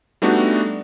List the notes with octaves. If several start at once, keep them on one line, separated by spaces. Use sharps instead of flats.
G3 A3 B3 D4 D#4 F#4